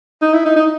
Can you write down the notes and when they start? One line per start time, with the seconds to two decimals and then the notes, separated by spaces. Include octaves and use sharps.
0.22 D#4
0.34 E4
0.45 D#4
0.56 D#4